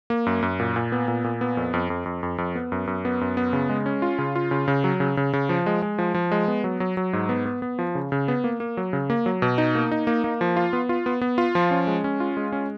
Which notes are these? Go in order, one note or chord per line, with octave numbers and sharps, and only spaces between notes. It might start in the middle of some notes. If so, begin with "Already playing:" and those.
A#3
F#2
F#2
A#2
A#2
B3
A#2
A#2
B3
F2
F2
F2
F2
F2
F2
B3
F#2
F#2
B3
F#2
B3
C#3
G#3
C#4
F4
C#3
F4
C#3
C#3
F#3
C#3
C#3
C#3
F3
G#3
G#3
F3
F3
G#3
B3
F#3
F#3
F#3
G#2
B3
B3
B3
F3
C#3
C#3
B3
A#3
A#3
F#3
C#3
A#3
F#3
B2
D#4
A#3
D#4
A#3
A#3
F3
F4
B3
F4
B3
B3
F4
F3
C#4
G#3
C#4
F4
G#3
C#4